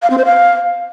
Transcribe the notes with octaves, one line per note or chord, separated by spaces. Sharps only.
F5
C4
C5
F5